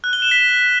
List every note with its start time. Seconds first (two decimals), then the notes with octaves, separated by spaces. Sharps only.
0.04 F#6
0.13 G7
0.22 E7
0.31 B6